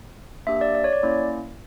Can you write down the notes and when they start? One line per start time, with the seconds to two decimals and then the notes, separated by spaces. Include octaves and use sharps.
0.47 A#3 D4 G4 E5
0.61 D5
0.75 D5
0.84 C#5
0.93 D5
1.03 A#3 C#4 E4